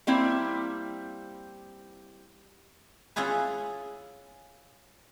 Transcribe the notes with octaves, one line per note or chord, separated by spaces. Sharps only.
G3 A#3 C4 E4
C#4 E4 F4 G#4 B4